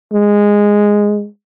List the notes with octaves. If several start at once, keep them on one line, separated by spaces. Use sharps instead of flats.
G#3